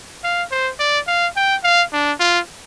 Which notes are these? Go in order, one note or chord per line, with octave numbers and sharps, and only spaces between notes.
F5
C5
D5
F5
G5
F5
D4
F4